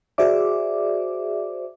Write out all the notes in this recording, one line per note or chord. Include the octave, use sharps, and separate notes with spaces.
F#4 G#4 C5 D5 E5 D6